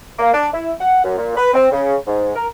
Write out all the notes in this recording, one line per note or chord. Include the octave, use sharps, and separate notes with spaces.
A#3
D4
E4
F#5
F#2
A#2
B4
C4
C#3
G#2
A#4